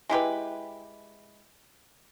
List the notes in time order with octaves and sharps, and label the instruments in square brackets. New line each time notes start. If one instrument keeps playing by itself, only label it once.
[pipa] G#3 E4 G4 B4